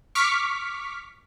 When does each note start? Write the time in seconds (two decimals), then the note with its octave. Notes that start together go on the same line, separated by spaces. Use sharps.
0.15 C#6 D6 F6 B6